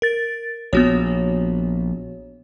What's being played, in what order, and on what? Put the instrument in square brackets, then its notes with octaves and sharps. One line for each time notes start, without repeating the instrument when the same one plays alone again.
[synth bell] A#4 A6
[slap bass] A#1 [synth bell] B3 F#4 C#5